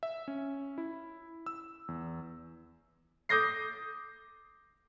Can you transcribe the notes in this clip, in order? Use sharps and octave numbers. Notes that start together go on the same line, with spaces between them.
E5
C#4
E4
E6
E2
D6 D#6 G6 A#6 C7